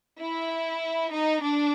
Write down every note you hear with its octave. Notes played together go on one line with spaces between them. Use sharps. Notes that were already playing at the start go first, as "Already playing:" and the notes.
E4
D#4
D4